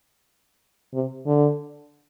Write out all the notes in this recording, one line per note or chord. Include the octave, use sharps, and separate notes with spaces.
C3
D3